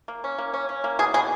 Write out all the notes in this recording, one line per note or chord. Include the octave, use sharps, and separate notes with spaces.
A#3
C#4
A#3
C#4
C#4
A#3
B2 G#4
B2 G#4